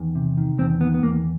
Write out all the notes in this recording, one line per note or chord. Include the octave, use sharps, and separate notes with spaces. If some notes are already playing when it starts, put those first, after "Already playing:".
Already playing: E2 D#3
C3
D#3
E2 C4
D#3 B3
B3
E2 A#3